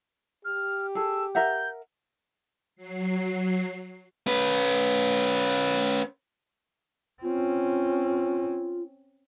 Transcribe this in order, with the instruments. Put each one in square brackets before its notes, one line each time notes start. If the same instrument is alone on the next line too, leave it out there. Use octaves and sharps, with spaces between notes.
[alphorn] G4 [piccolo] F6
[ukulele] G#4 A4 [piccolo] E6
[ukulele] A#4 E5 F#5 [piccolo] G6
[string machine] F#3 C7
[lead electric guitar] C#4 B4
[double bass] C4 C#4 [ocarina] F4